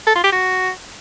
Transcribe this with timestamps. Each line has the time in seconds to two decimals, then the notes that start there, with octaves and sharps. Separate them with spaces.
0.07 A4
0.15 F4
0.24 G4
0.32 F#4